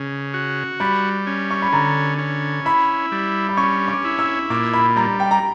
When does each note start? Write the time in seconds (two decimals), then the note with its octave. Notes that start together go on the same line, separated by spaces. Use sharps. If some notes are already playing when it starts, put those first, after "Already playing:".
Already playing: C#3
0.34 F#4
0.80 G3 B5
1.27 C#4
1.51 C#6
1.62 B5
1.73 D3 A#5
2.19 C#4
2.65 E4 B5
3.12 G3
3.49 B5
3.57 C#4 C#6
3.88 D6
4.05 E4
4.19 E6
4.50 A#2 D6
4.73 B5
4.96 G3 A#5
5.20 G5
5.31 A#5